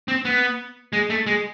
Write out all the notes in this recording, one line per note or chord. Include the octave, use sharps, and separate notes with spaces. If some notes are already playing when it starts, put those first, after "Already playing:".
C4
B3
G#3
A3
G#3